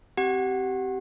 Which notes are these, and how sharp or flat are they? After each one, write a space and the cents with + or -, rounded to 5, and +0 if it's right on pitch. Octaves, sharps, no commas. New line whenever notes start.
C4 +0 G4 -25 F#5 +0